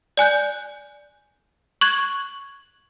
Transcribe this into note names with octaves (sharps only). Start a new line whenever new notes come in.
D5 G#5 F#6 G6
C#6 F#6 G#6